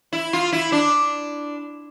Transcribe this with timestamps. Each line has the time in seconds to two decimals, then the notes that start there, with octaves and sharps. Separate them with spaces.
0.13 E4
0.33 F4
0.52 E4
0.72 D4